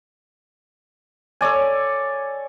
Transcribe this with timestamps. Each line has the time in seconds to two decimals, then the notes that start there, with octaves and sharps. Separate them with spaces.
1.41 A4 C#5 D5 G#5